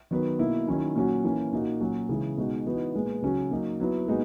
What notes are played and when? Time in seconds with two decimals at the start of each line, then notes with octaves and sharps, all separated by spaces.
0.11 D#3 F#3 B3
0.39 B2 A#3 E4
0.67 D#3 F#3 C#4 E4
0.95 A#2 F#3 C#4 F#4
1.24 E3 A#3 C#4
1.52 A#2 A#3 D#4 F#4
1.81 A#2 F#3 C#4 F#4
2.09 C#3 E3 G#3
2.37 B2 G#3 D#4 F#4
2.66 E3 B3 D#4 F#4
2.95 A#2 G#3 B3
3.22 C#3 F#3 C#4 F#4
3.51 F#3 A#3 D#4
3.80 F#3 B3 E4
4.08 A#2 G#3 B3 D#4 F#4